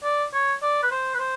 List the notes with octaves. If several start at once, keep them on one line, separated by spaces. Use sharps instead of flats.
D5
C#5
D5
B4
C5
B4
C5